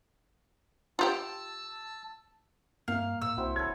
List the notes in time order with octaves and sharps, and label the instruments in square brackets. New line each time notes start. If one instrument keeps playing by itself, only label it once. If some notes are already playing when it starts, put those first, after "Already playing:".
[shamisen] F4 G4 G5 [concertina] A5 E6
[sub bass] G2 [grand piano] A#3 [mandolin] F5
[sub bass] A2 [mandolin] E6
[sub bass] C2 [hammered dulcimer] C4 E4 F#4
[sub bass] D#1 [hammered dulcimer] A4 B4 C#5 [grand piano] G#6